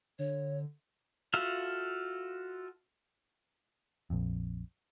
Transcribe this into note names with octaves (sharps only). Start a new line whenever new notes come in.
D3 C#5
F4 F#4 A4 E5 F5
A#1 F2